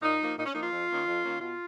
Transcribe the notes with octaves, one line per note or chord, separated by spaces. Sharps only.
A#2 D#4
F3 A#3
A#2 D#4
C#4
F3 A#3 D#4
F4
F2
D#3 A#3 C#4
F2
D#3 A#3 C#4
B2 F4